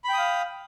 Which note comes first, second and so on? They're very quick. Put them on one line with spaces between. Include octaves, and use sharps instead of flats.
B5 G5 D#6 F5